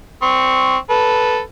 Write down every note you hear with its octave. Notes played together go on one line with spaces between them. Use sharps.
C4 C#6
A4 B4